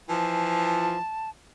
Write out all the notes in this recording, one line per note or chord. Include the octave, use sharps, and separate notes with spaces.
E3 F3 A5